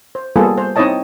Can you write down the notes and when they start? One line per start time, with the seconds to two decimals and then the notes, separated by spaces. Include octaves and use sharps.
0.15 C5
0.36 G3 A#3 B3 F4 G#4 A4
0.58 C5
0.76 C4 D#4 E4 C#5 D#5 A5